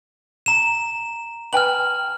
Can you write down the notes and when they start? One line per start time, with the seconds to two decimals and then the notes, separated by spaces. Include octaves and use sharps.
0.46 A#5 E7
1.53 B4 G5 G#5 F6 F#7